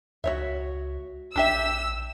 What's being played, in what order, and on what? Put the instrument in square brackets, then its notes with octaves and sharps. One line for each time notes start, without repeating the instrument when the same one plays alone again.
[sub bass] C#2 [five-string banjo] F#4 C#5 E5
[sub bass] A#1 [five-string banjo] D4 G4 E5 [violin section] E6